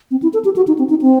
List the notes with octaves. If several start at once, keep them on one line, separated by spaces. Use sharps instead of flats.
C4
E4
A4
G4
F#4
D#4
C4
D#4
C4